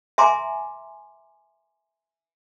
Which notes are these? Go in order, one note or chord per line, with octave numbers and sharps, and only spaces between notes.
E5 G#5 A#5 C6 D6